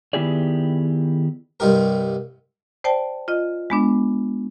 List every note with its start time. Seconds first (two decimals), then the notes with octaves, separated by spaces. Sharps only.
0.13 D#3 B3 E4 G4 G#4 D5
1.60 C2 G2 D#4 G4 A#4
2.84 C5 D5 G5 A5
3.28 F4 D#5
3.70 G#3 B3 D4